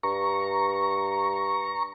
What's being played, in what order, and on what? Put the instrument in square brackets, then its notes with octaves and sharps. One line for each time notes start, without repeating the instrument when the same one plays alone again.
[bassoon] G2 [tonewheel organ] A#5 C#6